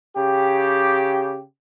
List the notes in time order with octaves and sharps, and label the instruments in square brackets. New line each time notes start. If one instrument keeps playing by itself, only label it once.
[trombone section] C#3 G4